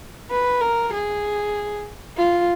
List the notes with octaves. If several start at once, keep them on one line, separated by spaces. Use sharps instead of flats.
B4
A#4
G#4
F4